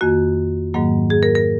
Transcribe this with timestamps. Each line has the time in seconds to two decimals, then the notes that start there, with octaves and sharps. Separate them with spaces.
0.01 F2 D#3 A#3 F#4
0.74 G#2 D#3 F#3 A#3
1.10 G#4
1.23 A#4
1.35 A#4